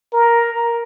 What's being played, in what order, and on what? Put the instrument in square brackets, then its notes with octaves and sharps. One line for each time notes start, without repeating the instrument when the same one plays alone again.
[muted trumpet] A#4